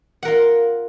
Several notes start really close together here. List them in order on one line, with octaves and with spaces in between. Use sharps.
F#5 A#4 F4